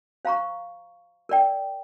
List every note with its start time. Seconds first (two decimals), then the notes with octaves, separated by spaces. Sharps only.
0.25 C5 F5 A#5 C#6
1.29 A#4 D5 G5